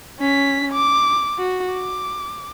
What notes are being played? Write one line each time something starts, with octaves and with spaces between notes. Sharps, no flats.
C#4 B6
D6
F#4
D6